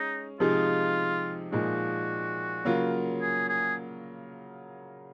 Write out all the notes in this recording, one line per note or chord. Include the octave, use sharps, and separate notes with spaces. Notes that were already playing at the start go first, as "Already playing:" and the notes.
Already playing: G#3 C#4 D#4
C3 F3 G#3 D#4 F4 G#4
A#2 F3 G#3 D#4 F#4
C#3 F#3 A#3 F4
G#4
G#4